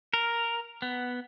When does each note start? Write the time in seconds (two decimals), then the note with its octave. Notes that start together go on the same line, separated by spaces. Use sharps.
0.14 A#4
0.82 B3